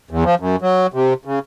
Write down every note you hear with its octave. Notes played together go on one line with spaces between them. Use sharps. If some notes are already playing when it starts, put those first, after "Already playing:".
E2
F3
F#2
F#3
C3
C#3